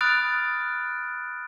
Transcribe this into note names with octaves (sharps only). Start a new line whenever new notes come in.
B5 D#6 F6 F#6 A6 D7